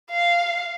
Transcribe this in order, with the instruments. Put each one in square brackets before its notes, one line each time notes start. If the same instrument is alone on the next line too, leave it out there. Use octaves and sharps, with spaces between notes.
[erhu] F5